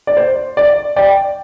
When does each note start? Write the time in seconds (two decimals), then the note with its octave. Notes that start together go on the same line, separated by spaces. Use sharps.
0.07 D5
0.17 C5
0.57 D5
0.96 D5 G5